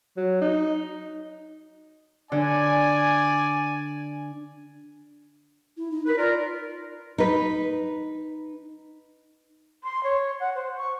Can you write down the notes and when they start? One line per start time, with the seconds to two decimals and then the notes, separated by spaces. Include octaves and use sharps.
0.17 F#3
0.42 D#4
2.32 D3 D5 G#5
5.77 E4
5.91 D#4
6.06 A#4 B4
6.18 F4 A#4 D5
7.18 D#4 B4
9.84 C6
10.04 C#5
10.40 F#5
10.55 C5
10.77 C#6